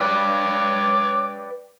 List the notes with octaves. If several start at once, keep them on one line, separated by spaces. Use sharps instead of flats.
B4 C#5 D5 G5 D6